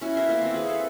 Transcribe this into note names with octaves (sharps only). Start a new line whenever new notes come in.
C#4 E4 F#4
B3 A#4 E5 C6
A#3 A4 C5 E5
A#3 C4
G#4 B4 E5
A4